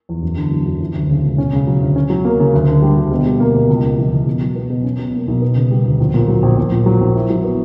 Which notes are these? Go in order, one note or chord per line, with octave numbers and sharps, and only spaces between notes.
E2
F#2
D3
F#3
F#2
E3
D2
C#3
E1
C#4
C#3
F#3
D2
C#4
F#3
A#3
C#3
D2
D3
G3
D2
B2
G3
A#3
B2
C#2
C#3
E3
C#2
B2
F#3
B3
B2
C#4
B2
A#3
B1
B3
C#3
G3
D2
A#1
A#2
F#3
A#1
A#1
A#2
F#3
A#1
E4
F#3
B3